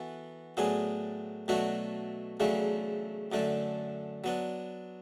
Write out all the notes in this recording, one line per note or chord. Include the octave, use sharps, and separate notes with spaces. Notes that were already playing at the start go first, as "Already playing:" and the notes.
Already playing: E3 B3 F#4 A4
A2 F#3 B3 D4 G#4
B2 F#3 A3 D4 F#4
E2 C#3 F#3 A3 D4
F#2 D3 A3 D4
F#3 B3 D4